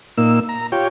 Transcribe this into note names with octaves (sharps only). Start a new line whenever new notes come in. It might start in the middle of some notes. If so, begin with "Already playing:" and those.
A#2 A#3 D#4 E6
A#5
F4 G4 C#5 G5